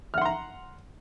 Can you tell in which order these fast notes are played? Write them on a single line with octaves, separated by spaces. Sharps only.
F6 F#5 C6 A#5